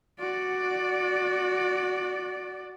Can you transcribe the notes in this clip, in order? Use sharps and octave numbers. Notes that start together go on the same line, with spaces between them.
F#4 D5